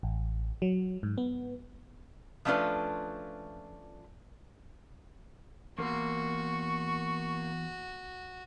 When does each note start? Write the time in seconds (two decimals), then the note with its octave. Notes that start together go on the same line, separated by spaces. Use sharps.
0.03 A1
0.62 F#3
1.03 G#2
1.18 B3
2.45 F3 A3 C#4 D4 F4 B4
5.78 E2 A#3 F#4 A#4 C6 C#6